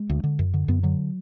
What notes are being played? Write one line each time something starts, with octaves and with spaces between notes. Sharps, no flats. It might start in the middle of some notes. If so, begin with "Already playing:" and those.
Already playing: G#3
D2
D3
F#2
D3
F#2 B3
D3 F#3